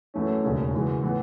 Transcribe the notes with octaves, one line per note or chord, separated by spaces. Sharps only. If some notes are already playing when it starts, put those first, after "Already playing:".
F#2 E3 A3 C#4
E1 D#2 C#3
F#2 C#3 E3 G#3
A2 E3 B3